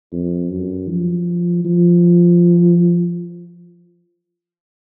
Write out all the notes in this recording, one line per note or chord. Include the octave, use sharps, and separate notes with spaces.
F2
F#2
F3
F3